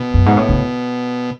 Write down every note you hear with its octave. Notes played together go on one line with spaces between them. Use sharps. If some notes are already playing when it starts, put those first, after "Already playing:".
Already playing: B2
F#2
G#2
A2
C#3